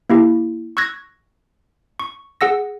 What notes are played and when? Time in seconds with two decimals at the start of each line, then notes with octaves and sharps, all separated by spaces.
0.10 A#3 E4 G4
0.77 C#6 E6 F#6 G#6 A#6
2.00 C#6
2.41 G#4 F#5 E6 A#6